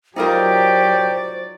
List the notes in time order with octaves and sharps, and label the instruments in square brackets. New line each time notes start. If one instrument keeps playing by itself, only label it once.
[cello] F#3 D5 [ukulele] D#4 F4 A#4 [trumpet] G4 [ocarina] C5